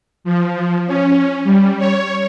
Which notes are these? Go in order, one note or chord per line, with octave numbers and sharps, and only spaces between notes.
F3
C#4
G3
C#5